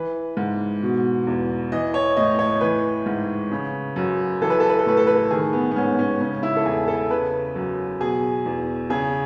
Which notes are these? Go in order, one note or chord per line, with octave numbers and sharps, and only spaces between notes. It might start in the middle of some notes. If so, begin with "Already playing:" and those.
Already playing: E3 B4
G#2
B2
E2
E3 D#5
C#5
A2 D#5
C#5
E3 B4
G#2
C#3
F#2
E3 A4
B4
A4
B4
A4
A2 B4
A4
B4
A4
D#3 G#4
B3
B3
G#2 C#4
C#4
C#3 C#4
E4
A4
E2 G#4
A4
C#3 B4
F#2
B2 G#4
E2
C#3 G#4